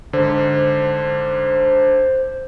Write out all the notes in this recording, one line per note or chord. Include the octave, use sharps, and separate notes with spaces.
G#2 D3 C5